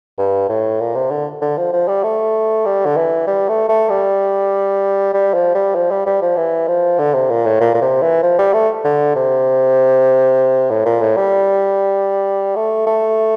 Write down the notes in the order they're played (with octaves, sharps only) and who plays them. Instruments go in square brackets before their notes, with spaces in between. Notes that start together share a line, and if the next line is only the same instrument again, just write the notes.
[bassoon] G2
A2
A#2
C3
D3
D3
F3
F3
G3
A3
G3
D3
E3
G3
A3
A3
G3
G3
F3
G3
F3
G3
G3
F3
E3
F3
D3
C3
A#2
A2
A#2
A#2
C3
E3
F3
G3
A3
D3
C3
A2
A#2
A2
G3
A3
A3